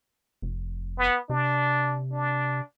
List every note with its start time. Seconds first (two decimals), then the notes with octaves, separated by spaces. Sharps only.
0.42 F1
0.98 B3
1.30 C3 D4
2.12 D4